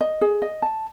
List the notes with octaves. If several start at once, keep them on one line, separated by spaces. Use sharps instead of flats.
D#5
G#4
D#5
A5